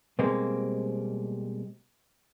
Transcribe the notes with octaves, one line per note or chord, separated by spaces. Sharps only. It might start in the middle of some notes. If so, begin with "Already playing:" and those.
B2 G3 G#3 A#3 C4